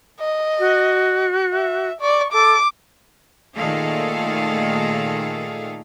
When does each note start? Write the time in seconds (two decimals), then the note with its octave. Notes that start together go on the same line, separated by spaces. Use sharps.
0.20 D#5
0.59 F#4
1.54 E5
2.01 D5 C#6
2.33 A4 D6
3.56 A#2 D#3 A3 G#4 A4 F5